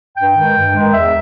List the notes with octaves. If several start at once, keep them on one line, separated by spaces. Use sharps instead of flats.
G2 G5
D#3 G#3
G2
D#3 G#3
E2 E5